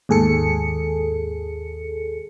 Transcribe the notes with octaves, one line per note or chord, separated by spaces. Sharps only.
D#2 G#2 G#4 A4 C#7